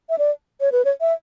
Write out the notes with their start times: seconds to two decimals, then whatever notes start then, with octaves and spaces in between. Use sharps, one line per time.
0.09 E5
0.18 D5
0.61 C#5
0.72 B4
0.85 C#5
1.01 E5